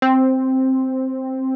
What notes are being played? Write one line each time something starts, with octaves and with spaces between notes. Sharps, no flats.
C4